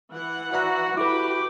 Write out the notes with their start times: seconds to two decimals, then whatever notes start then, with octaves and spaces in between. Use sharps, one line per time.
0.12 E3 F#5
0.53 F#4 D5 E5 A#5
0.97 E4 F#4 G4 A4 B4 B5 D6